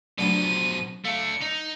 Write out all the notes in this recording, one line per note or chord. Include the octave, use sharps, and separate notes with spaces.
B2 F3 F#3 A3 D4 D#7
A3 D4 F5 C#7
D#4